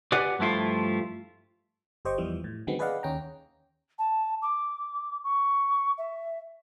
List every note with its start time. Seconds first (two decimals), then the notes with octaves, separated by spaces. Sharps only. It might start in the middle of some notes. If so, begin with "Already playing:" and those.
0.12 G4 B4 D5 F#5 G#5
0.39 G2 F3 A3 E4 F4
2.05 G1 G4 C5 D#5 G5 C#6
2.18 E2 E3 F3 G3
2.44 A2
2.67 D3 D#3 F#3 G#3 B3 C4
2.79 G#4 B4 D5 D#5 F5 F#5
3.03 D#2 C#4 G5 A#5
3.99 A5
4.42 D6
5.24 C#6
5.98 E5